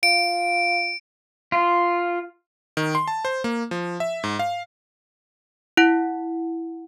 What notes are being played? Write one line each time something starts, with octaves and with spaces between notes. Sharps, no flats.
F4 D7
F4
D#3
C6
A5
C5
A#3
F3
E5
G#2
F5
E4 F#5